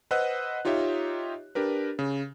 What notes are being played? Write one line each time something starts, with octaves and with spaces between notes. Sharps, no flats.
B4 C5 D#5 F#5 E6 F#6
D#4 F4 G4 C#5 D#5 E5
D4 G4 A#4 B4
C#3